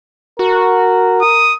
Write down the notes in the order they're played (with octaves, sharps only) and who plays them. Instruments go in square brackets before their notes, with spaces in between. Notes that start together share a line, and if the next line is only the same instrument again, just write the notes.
[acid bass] F#4 [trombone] A#4
[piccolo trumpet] D#6